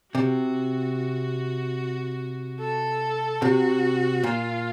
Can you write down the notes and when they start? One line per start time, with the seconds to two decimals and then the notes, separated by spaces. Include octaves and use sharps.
0.14 C3 F#4
2.60 A4
3.41 C3 F#4
4.23 A#2 F4